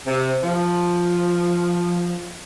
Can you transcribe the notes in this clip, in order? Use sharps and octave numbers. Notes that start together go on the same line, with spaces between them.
C3
F3